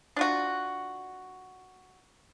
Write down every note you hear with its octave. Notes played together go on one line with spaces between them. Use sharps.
D4 F4 F#4